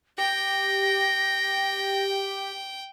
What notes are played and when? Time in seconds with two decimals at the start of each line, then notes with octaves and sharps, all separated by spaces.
0.18 G4 G5 A#6